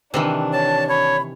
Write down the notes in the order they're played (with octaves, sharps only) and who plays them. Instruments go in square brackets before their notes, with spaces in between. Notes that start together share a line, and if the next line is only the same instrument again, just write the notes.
[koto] C3 D#3 E3 [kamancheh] D4
[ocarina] C#5 [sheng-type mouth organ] A5
[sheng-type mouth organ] C#5 [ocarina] B5